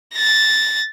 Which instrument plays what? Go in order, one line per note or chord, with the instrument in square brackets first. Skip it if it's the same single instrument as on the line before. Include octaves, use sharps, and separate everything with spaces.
[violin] A6 A#6